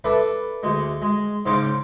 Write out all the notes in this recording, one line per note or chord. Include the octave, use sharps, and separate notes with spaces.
D4 A4 B4 E5
D2 G#3
G#3
G#2 C#3 C5 F5 D6